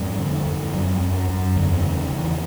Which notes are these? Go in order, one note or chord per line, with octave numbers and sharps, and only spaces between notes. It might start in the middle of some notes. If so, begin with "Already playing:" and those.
Already playing: F2 G#2 G3
D3
F2
F#2
F#2
F#2
E2 D3
D#3
C#3
D#3
E2
E3